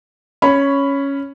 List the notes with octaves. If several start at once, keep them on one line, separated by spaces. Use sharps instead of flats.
C#4 C#5 B5